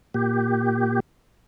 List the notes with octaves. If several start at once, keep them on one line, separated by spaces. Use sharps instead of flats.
A#2 G4